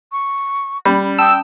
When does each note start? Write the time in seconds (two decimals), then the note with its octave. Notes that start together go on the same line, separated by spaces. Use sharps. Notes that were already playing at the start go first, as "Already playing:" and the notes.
0.12 C#6
0.85 G3 C#4 B5
1.19 G5 A5 D#6 E6